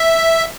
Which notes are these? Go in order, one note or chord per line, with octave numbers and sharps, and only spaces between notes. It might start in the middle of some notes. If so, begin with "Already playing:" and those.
Already playing: E5